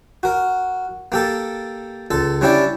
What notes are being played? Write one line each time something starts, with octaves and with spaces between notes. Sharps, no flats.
F#4 A#4
A#3 G4 A4
C#2 A4
G3 C#4 D4 E4 G4 D5